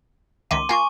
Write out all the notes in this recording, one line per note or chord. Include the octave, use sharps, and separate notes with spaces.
C#2 D#3 E5 C6 D6 D#7
A#3 F4 G#5 C#6